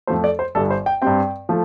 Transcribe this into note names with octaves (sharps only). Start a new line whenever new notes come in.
F2 F3 A3 C5
D5
C5
G1 G2 G3 A4
C5
G5
G2 G3 C4 G5
F3 A3